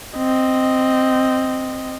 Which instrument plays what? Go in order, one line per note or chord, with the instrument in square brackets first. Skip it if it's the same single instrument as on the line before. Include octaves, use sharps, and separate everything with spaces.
[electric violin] C4 D#5